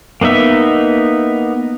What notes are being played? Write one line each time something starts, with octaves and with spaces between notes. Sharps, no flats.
A#3 B3 D#4 E5